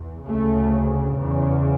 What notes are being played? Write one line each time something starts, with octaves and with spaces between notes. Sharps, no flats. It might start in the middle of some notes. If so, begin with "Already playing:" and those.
Already playing: E2
D2 C#3 A3
E2 C#3